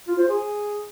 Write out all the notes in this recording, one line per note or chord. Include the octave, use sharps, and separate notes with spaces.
F4
C5
G#4